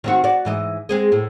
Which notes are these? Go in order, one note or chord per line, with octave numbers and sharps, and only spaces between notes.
D#3 C4 F#4
F#4 D5
G#2 E3 D#5
G#3 C4 G#4
A2